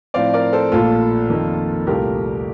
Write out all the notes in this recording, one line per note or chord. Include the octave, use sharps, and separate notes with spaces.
A2 F3 C4 D5 F5
A#4 D5
A4 C5
A#1 A#2 A3 F4 A4
F2 D#3 A#3
C2 A#2 A3 G4 A#4